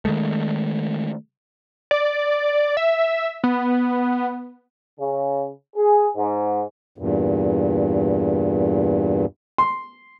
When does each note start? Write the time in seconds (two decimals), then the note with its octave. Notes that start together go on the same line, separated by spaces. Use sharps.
0.05 D#3 E3 G#3 A3
1.91 D5
2.77 E5
3.44 B3
4.98 C#3
5.76 G#4
6.15 G#2
6.98 E2 G2 A#2
9.58 C6